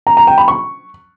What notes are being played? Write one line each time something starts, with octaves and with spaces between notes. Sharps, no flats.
A#5
A#5
G5
B5
C#6